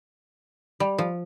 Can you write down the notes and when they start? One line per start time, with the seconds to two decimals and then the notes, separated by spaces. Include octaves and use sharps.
0.80 G3
0.98 F3